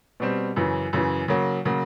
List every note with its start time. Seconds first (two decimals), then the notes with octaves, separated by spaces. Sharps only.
0.20 B2 G3 C4
0.56 F#2 C#3 E3
0.93 F#2 C#3 E3
1.28 C#3 F#3 A#3
1.65 C#3 F#3 A#3